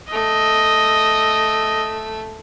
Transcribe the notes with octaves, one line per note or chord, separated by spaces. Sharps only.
A3 D#5 E6